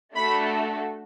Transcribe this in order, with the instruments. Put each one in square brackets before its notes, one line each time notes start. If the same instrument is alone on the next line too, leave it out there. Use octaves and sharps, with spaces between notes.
[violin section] A3 D4 F#4 A4 B5